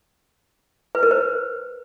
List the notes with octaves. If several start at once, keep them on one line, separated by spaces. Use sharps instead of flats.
B4
A#4
C5